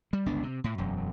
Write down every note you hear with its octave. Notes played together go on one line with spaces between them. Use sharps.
G3
G1 C#2 B3 D4
C3
A2
E1 F#2